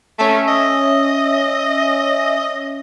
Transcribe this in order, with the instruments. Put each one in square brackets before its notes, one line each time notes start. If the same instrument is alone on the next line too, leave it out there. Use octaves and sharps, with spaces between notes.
[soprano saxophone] A3 [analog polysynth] C#4 E5
[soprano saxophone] D#5